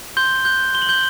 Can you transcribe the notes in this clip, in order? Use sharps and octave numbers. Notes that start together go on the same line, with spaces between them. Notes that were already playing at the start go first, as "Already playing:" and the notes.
C6 G6 G7
F#6 G6 G7
C6 G7
F#7
G6 G7